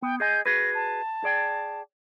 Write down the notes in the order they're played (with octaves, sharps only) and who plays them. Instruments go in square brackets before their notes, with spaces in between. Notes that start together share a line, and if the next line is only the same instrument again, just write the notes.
[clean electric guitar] B3 [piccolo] G5
[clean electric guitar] G#4 D#5 G#5 [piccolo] G6
[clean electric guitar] F#4 G#4 B4 [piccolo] A#6
[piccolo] A5
[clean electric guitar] G#4 D5 G5